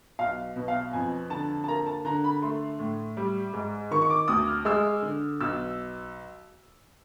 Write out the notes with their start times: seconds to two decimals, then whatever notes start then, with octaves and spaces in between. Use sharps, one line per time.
0.19 B1 F5
0.56 B2
0.68 F5
0.93 F2 G#5
1.30 D3 A5
1.64 A5
1.68 A#3 A#5
1.86 A5
2.05 D3 A#5
2.24 B5
2.42 A3 C6
2.79 A2
3.17 G3
3.53 G#2
3.91 D#3 C#6
4.02 C#6
4.10 D6
4.28 D2 D#6
4.47 F6
4.65 G#3 E6
5.02 D3
5.41 B1 E6